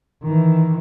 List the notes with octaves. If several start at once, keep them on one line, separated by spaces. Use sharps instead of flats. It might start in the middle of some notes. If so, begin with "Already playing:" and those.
D#3 E3